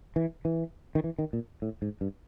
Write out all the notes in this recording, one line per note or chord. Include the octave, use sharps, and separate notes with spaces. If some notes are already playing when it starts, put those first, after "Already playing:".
E3
E3
D#3
E3
D#3
A#2
A2
G#2
G2